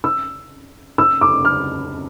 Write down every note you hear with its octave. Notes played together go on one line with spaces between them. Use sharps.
E6
E6
D6
F6